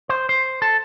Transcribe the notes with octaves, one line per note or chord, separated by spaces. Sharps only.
C5
C5
A4